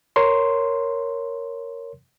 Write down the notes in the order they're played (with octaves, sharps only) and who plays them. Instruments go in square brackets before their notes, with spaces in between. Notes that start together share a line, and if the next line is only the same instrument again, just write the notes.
[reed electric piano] A#4 C#5 C6